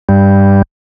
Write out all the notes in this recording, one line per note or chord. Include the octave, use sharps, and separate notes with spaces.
G2 G3